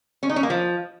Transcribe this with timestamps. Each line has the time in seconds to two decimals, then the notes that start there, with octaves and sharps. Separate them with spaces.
0.23 C#4
0.29 D#4
0.36 C#4
0.43 A#3
0.50 F3